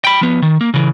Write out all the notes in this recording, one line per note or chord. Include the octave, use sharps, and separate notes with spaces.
G5 B5
F3 B3
D#3
A#3
C#3 E3